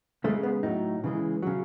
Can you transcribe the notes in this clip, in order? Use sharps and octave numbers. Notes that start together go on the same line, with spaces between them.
C#3 G#3 A3
B3
A2 F#3 D#4
C#3 E3 G#3
C#3 F#3